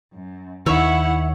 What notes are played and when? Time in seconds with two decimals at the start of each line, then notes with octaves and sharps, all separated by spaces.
0.14 F#2
0.66 D#2 D#3 E4 C#5 E5 F#5 C#6